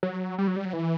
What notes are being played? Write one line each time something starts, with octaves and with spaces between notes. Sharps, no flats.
F#3
G3
F#3
G3
F#3
E3